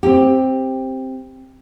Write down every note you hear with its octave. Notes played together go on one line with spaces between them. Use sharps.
C4 G4